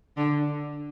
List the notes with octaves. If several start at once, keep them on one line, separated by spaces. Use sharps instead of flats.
D3